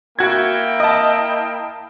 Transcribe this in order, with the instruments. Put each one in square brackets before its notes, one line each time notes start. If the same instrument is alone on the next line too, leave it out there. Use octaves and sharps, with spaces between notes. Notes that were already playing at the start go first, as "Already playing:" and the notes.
[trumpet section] A#3 E4 G5 [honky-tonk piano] F#4 G#6
[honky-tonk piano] D#5 A5